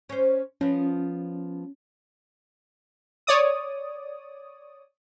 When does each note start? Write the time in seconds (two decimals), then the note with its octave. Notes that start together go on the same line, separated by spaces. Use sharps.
0.09 C#4 C5
0.61 F3 B3 C#4
3.27 C#5 D5 D#6